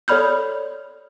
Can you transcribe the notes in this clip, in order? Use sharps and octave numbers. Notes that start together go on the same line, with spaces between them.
A4 C#5 D5 B5 F6 G6